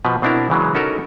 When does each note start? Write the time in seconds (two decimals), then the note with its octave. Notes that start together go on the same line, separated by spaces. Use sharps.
0.05 B2 F3 B4
0.22 B2 C4 D4 E4 A#4
0.50 C#3 E3 F#3 G#3
0.75 C#4 D#4 F#4 A4 A#4